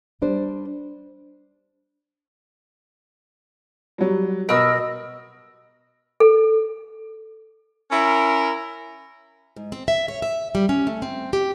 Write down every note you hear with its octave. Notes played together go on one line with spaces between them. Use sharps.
G3 D4 C5
F#3 G3
B2 A#4 D#5 B5 D#6 E6
A4
C#4 E4 A#4
G#2
C4
E5
C#5
E5
G3
C#4
A3
C4
G4